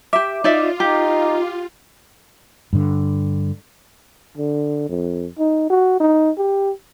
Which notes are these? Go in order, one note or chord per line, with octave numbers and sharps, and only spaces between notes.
G4 E5 D6
D#4 F4 D5 E5
D#4 G4
G2 D3
D3
F2
D#4
F#4
D#4
G4